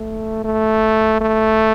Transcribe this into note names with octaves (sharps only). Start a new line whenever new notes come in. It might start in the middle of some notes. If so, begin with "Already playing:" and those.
Already playing: A3
A3
A3